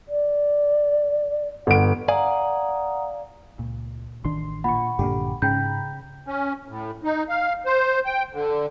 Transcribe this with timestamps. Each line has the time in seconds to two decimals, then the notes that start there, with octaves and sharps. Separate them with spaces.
0.08 D5
1.67 G1 F#5 D7
2.08 D5 F5 F#5 G#5 A#5 D#6
3.59 C#2 A#2
4.25 A1 D#3 D4 C6
4.64 A#2 F#5 B5 C#6
4.99 A#1 G2 A#2 D3 A#3 G4
5.42 G#2 C#3 G5 A#5 B5 G6
6.27 C#4
6.68 A2
7.04 D#4
7.29 F5
7.66 C5
8.05 G5
8.33 D3